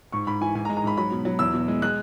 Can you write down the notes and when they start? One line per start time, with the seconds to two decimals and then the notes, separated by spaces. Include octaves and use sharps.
0.12 G#2 C#6
0.27 G#2 B5
0.41 E3 G#5
0.55 G#2 G#5
0.65 A#5
0.69 G#3
0.77 A#5
0.84 G#2 B5
0.97 F#3 B5
1.11 B2
1.25 F#3
1.39 E2 E6
1.54 B2
1.68 G#3
1.82 G#3 F#6